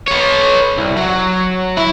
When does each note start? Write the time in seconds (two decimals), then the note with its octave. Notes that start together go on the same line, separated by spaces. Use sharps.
0.08 B4 C#5
0.77 C2
0.97 F#3
1.77 E4